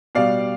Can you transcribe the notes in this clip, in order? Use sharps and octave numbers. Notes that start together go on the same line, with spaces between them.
B2 G3 D5 F5